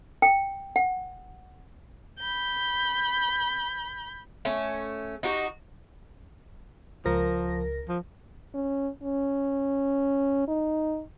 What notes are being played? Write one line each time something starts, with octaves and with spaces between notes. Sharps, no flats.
G5
F#5
B5 G6
A3 C#4
D#4 F#4 G4
C#2 F3 A#4 A#6
F3
C#4
C#4
D#4